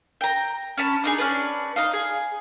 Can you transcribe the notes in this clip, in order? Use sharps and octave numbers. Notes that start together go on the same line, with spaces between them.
G5 A#5
C#4 A5 B5
D4 D#4 G#4
C#4 D4 B4
D#4 D#5 F5
G#4